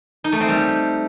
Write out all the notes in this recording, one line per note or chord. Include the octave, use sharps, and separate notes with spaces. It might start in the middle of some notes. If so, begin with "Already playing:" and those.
D#4
A3
C4
G3